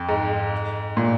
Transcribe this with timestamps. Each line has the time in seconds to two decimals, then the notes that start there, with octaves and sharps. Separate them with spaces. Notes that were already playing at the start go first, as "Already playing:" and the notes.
Already playing: F2
0.09 G#2
0.97 A#2